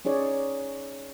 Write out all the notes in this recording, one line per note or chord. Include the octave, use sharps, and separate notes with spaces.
C#4 D#4 G#4 C#5 D5